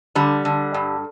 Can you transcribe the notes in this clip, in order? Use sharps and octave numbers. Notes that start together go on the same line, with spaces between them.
D3 G3
D3
G2